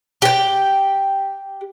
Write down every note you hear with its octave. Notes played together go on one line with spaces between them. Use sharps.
G4 G5